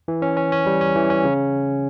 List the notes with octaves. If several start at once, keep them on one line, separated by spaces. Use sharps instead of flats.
E3
C#4
C#4
C#4
G3
C#4
E3
C#4
C#3